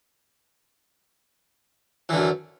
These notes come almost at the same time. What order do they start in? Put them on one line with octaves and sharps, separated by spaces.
E3 D3 F#2